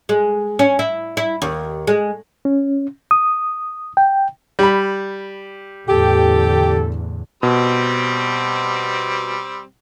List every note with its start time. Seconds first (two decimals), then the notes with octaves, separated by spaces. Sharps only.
0.09 G#3
0.59 C#4
0.79 E4
1.17 E4
1.42 D#2
1.87 G#3
2.45 C#4
3.11 D#6
3.97 G5
4.59 G3 B5
5.88 E2 A2 D3 G4 A4
7.43 B2 G3 C4